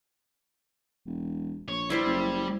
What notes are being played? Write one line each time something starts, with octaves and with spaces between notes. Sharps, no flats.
E1
A#1 C#5
G3 E4 C5 D5
F#1